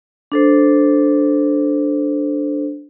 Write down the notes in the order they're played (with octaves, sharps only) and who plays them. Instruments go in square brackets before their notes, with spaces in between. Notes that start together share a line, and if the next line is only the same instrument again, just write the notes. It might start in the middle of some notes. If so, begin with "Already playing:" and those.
[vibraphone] D4 A4 C5